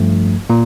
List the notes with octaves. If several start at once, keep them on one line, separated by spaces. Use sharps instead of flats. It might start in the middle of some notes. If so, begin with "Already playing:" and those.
Already playing: G2 F3 A3
A#2